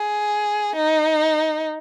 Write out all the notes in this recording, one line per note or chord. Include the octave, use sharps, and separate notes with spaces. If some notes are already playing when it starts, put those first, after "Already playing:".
Already playing: G#4
D#4